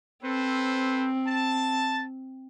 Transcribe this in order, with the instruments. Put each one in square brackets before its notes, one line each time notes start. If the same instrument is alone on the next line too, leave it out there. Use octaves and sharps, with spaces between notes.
[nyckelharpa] C4 [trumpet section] A4 B4 C5
[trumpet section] A5